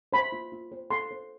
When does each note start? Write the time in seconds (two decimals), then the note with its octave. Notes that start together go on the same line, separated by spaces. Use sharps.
0.13 C5 B5
0.32 F4
0.52 F4
0.72 C5
0.91 A4 C6
1.11 C5